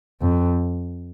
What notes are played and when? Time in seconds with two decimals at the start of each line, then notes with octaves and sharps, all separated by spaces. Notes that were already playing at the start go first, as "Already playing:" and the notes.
0.21 F2